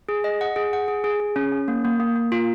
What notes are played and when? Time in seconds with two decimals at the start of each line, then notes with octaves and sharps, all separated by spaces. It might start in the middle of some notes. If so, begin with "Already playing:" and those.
0.09 G#4
0.24 D#5
0.41 F#5
0.56 G#4
0.73 F#5
0.88 G#4
1.04 G#4
1.20 G#4
1.36 C#4
1.52 C#4
1.68 A#3
1.85 A#3
2.00 A#3
2.15 A#3
2.32 F4